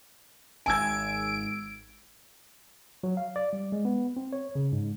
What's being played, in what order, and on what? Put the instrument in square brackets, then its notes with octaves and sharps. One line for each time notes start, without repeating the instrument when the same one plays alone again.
[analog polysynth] G#1 D7 [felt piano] G#5 E6 G#6
[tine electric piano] F#3
F5
D5
G3
G#3
B3
C4
C#5
C#3
G#2